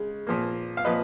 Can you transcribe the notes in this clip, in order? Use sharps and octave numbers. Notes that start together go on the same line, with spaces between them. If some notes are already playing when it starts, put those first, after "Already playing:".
Already playing: C#3 G#3
A#2 F3 A#3
F5
A#2 F3 B4 D#5